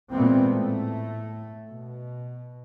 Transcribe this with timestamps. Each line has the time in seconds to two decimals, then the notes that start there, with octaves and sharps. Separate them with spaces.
0.12 A#2 E3 G#3 B3 C4
0.53 A2 A3
1.70 B2